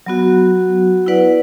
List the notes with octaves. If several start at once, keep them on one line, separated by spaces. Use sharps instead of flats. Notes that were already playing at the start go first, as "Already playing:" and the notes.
F#3 B3 F#4
E4 B4 D5 F#5